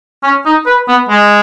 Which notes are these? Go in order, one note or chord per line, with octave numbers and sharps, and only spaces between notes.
C#4
D#4
B4
B3
G#3